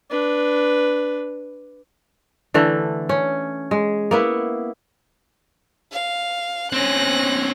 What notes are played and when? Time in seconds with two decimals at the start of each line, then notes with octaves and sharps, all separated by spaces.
0.10 D4 B4
2.54 D3 E3 A3
3.09 C#4
3.71 G#3
4.11 A#3 B3 E4
5.92 F5
6.72 C4 C#4 F#6 A#6